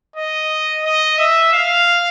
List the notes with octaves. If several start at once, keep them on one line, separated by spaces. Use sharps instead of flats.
D#5
D#5
E5
F5